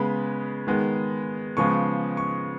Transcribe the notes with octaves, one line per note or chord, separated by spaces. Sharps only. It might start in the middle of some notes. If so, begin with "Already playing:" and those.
Already playing: C#3 G#3 B3 B5
D#3 G#3 B3
C#3 F3 G#3 B3 C#6
C#6